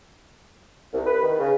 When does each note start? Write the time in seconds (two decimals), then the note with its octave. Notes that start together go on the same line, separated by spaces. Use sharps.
0.93 C2
1.06 B4
1.23 D#3
1.39 C#3